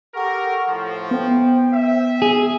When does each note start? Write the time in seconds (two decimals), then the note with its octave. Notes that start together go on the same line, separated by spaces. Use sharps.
0.14 G4 A4 A#4 F#5 C#6
0.68 A2 F3
1.11 B3 C5 G5
1.72 E5
2.22 G#4